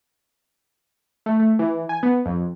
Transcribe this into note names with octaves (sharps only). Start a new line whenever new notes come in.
A3
A3
E3
G#5
B3
F2